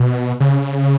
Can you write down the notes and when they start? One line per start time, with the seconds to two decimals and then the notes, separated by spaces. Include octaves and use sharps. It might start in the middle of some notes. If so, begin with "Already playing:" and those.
Already playing: B2
0.40 C#3